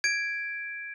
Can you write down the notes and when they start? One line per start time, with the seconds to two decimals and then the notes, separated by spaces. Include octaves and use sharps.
0.04 G#6 D7